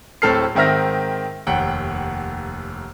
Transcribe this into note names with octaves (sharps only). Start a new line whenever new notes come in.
D1 A2 C4 A4 F6 C7
G#2 D#3 C4 E5 F6 A#6
F1 D#2 F#5 G5